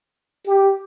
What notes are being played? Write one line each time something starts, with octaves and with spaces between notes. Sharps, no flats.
G4